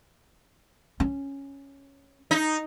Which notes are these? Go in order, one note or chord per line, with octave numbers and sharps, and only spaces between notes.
C#4
D#4